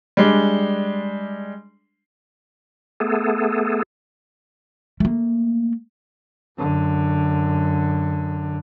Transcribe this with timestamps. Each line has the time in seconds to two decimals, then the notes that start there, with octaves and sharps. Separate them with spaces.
0.17 G3 G#3 D4
3.00 A3 B3 G#4 A4
5.00 A3 A#3
6.58 F#2 D3